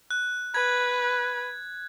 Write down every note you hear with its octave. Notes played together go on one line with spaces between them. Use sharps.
F#6
B4 G#6